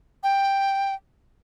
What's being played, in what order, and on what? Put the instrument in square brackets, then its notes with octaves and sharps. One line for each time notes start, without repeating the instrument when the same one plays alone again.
[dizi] G5